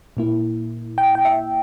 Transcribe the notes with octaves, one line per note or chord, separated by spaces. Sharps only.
A#2 A#3 E4
G5
G5
E5